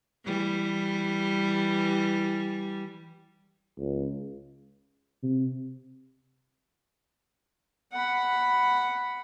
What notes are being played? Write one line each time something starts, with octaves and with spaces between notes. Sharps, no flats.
E3 G3
C#2
C3
F#5 B5